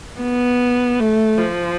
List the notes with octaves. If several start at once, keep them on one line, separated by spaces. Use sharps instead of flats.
B3
A3
F3